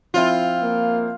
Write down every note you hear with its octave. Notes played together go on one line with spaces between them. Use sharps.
F3 C4 E4 F4
A#3